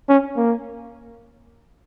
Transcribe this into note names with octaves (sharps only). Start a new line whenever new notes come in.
C#4
A#3